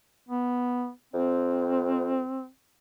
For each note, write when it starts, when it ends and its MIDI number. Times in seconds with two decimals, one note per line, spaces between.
0.29 0.90 59
1.14 2.21 41
1.14 2.48 60